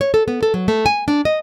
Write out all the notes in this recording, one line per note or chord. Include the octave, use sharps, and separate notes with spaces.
C#5
A4
B3
A4
F#3
A3
G#5
D4
D#5